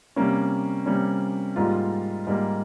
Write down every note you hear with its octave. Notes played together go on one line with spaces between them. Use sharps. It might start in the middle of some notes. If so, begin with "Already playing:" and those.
C3 G3 A#3 C#4
C3 G3 A#3 C#4
G#2 G3 A#3 F4
G#2 G3 A#3